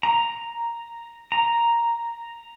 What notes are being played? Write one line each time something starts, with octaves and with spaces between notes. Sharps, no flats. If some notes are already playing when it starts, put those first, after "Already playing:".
A#5
A#5